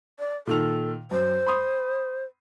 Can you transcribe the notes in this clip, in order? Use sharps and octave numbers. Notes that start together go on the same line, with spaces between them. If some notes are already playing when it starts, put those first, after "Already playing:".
D5
A#2 D#3 A4 F7
F#2 C5
B5 C6 D#6